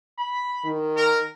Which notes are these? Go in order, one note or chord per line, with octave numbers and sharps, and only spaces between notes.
B5
D#3
A#4